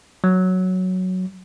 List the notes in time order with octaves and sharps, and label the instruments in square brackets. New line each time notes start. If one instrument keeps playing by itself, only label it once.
[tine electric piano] F#3